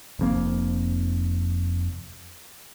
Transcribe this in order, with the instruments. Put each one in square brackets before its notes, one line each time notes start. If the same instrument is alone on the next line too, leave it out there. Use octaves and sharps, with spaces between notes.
[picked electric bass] F1 F2 A#3